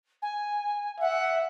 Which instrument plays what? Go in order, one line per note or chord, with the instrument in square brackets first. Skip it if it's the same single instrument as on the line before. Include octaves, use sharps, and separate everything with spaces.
[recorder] G#5
[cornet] E5 [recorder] F#5